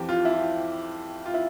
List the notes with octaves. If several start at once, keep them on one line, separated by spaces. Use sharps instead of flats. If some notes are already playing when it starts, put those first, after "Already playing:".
Already playing: F2 E3 G4
F4
E4
F4
F4
E4